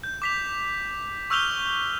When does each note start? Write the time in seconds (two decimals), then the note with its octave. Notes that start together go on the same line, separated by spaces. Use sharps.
0.04 G6
0.22 D6 B6 F7
1.30 C#6 E6 F6 G6 F7 G7